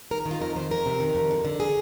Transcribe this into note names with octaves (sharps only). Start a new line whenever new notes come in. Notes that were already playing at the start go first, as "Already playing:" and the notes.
D#3 A#4
D#3
F4
F2 A#4
F2 C5
F2 A#4
C3
D#3
F2
D3
D3
G#4